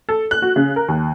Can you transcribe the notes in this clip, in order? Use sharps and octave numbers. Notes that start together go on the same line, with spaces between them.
A4
F#6
F#4
C#3
A#4
D#2